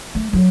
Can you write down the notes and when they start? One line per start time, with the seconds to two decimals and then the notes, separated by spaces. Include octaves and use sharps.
0.15 A3
0.33 F#3